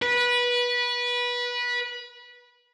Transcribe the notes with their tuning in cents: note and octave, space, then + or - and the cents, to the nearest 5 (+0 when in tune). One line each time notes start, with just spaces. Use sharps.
B4 -20